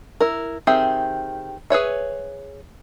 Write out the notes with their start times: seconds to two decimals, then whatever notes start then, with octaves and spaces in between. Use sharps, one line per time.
0.20 E4 A#4
0.67 D#3 C4 G4 G#4 E5
1.70 G#4 B4 C#5 E5